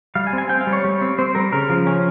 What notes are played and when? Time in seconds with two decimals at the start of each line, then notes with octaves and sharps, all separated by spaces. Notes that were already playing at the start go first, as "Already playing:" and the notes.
0.15 G3 F5
0.27 G#5
0.33 C4
0.38 G#5
0.49 C4 G5
0.61 F5
0.67 G3
0.73 C#5
0.84 G3
1.01 C4
1.19 C4 C5
1.35 G3 A#4
1.53 C#3 A#4
1.70 F3
1.87 C#4